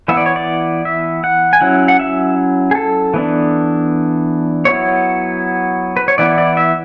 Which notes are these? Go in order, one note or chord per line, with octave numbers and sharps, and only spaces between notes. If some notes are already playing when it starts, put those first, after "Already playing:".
E3 B3 E4 E5
D5
C#5
D5
E5
F#5
G#5
F#3 C#4 E4 F#5
F#5
E5
G#4
A4
E3 B3 D4
F#3 B3 E4 C#5
B4
C#5
E3 B3 E4 D5
D5
E5